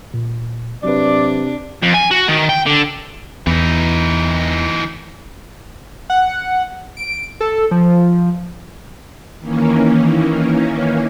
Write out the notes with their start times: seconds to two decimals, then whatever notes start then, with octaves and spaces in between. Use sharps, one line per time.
0.14 A#2
0.84 C3 F#3 D4 B4 D5
1.82 F2
1.94 G#5
2.11 F#4
2.28 D#3
2.49 G5
2.66 D3
3.47 E2 E3 D#4
6.10 F#5
6.97 D7
7.40 A4
7.71 F3
9.39 D#3 E3 A#3 C#4